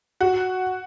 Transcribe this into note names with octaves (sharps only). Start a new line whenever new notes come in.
F#4